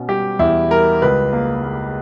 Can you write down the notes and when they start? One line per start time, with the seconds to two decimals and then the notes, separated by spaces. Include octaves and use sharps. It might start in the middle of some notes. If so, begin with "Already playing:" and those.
Already playing: B2 C#4
0.09 G3 G4
0.39 E2 E4
0.70 G3 A#4
1.02 C#2 B4
1.33 A#3
1.64 A#3